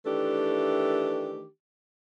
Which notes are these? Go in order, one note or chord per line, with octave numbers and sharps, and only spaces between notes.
D#3 E3 A3 D4 G4